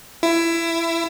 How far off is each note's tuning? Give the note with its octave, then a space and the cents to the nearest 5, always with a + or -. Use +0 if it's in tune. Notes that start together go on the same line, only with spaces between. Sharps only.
E4 +20